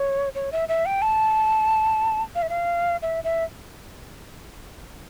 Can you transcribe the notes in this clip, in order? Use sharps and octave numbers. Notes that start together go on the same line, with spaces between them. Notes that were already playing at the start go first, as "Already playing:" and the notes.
Already playing: C#5
C#5
E5
E5
G5
A5
F5
E5
F5
E5
E5